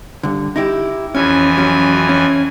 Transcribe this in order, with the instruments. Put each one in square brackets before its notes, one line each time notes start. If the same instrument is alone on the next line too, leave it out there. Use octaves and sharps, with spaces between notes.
[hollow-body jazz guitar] G2 D3
D#4 E4 G4
[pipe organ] F2 E3 G#5 [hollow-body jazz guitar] C#4
[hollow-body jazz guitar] F#3 C#4
C#4